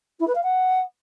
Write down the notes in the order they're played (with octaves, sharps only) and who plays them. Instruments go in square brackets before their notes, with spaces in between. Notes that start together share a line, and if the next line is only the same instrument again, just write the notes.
[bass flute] E4
B4
F5
F#5